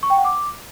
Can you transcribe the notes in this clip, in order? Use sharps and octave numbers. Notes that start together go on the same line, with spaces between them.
C#6
G5
F#5
D6